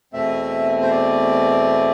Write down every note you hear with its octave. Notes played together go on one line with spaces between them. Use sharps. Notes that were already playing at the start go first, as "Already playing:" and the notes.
E2 B2 A3 C4 E5
C5
D5